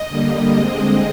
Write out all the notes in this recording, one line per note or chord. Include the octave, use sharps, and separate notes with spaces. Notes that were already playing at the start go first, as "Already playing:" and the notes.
Already playing: D#5
D3 G3 A#3
D3 G#3 C4